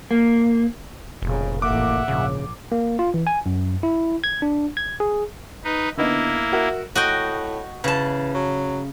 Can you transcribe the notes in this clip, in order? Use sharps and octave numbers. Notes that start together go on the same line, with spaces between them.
A#3
F1 A#2 C#3
A1 A#3 E5 F#5 D6
A#1 G#2 C#3
A#3
F4
E3
G#5
F#2
E4
G#6
D4
G#6
G#4
D#4 B4
D3 A#3 B3 D#4 E4
F#4 A#4 E5
A2 F#4 D#5 G5
C#3 E3 A5
F#3